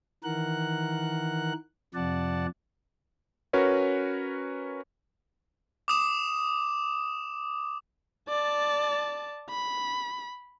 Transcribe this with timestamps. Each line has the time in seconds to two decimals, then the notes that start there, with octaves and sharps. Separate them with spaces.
0.24 D#3 E3 A#4 F#5 F#6
1.94 F2 C3 F3 D5 F#5 A5
3.53 C#4 F#4 A#4 B4 C#5
5.88 D6 D#6 E7
8.29 D5 A5
9.50 B5